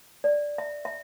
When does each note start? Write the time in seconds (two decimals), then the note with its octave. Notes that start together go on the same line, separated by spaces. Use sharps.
0.24 D5
0.58 E5
0.85 E5